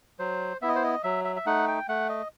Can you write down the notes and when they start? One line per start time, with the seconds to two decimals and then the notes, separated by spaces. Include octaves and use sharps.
0.19 F#3 C5
0.62 B3 E4 E5
0.68 D#5
0.76 C5
0.84 D#5
1.03 F#3 E5
1.25 E5
1.36 E5
1.46 A3 D#4 F#5
1.68 G5
1.88 A3 F#5
2.09 D#5